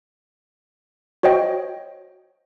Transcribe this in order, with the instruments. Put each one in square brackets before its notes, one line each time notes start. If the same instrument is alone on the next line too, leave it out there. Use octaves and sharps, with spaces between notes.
[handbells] F#4 C5 C#5 D#5 G5